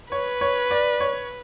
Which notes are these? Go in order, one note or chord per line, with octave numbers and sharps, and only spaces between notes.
B4 C#5
C#5
D5
C#5